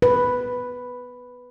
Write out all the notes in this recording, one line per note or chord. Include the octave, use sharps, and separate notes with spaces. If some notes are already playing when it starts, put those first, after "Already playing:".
B4